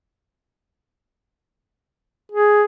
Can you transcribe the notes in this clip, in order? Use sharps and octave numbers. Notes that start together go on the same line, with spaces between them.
G#4